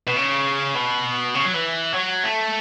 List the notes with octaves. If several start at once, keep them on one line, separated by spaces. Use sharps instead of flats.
B2
C#3
B2
C#3
F#3
E3
F#3
A3